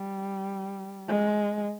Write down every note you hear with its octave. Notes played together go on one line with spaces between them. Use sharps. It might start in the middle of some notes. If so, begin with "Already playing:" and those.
Already playing: G3
G#3